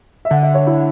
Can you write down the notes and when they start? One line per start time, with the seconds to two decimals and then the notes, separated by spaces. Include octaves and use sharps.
0.25 E5
0.31 D3 F#5
0.43 E5
0.55 C#5
0.67 E4